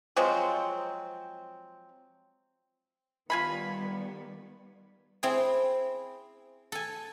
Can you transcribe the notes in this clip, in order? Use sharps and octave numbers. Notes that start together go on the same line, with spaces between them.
F3 F#3 G#3 C4
D#3 G3 B3 F4 G#5 B5
C4 E4 G#4
A4 G#5